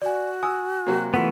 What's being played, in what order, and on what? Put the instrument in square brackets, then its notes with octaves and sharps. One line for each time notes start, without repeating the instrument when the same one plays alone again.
[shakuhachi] F#4 [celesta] D5 G#5
[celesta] G#5 [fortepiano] D#6 E6
[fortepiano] C3 F#3 A#3
[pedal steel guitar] E3 A3 B3 [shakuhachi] F4 [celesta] F#5 B6